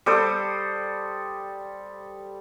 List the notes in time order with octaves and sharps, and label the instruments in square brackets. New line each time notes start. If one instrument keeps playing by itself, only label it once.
[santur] G3 A4 C5 D#6